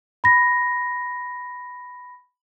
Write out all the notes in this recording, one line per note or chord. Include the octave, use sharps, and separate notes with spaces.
B5 A#6